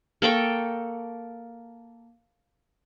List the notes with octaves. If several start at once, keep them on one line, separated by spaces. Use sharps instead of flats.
A#3 A4 G5 C#6